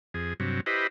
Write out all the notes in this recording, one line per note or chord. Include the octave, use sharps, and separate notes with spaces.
F2 G#4
G2 C3 F#3
E4 G4 B4 C5 D#5